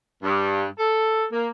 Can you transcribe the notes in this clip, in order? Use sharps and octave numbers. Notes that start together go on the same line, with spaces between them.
G2
A4
A#3